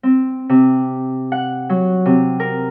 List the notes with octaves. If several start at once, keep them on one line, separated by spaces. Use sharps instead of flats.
C4
C3
F#5
F#3
C3
A#4